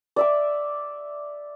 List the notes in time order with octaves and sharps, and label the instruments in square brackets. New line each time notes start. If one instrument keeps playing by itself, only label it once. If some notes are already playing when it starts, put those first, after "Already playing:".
[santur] D5 E5 D6